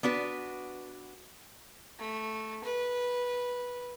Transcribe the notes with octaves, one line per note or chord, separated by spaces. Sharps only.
B3 D4 F#4 B4
A3
B4